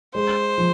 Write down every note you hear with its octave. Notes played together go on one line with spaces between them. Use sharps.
G#3 C5
F3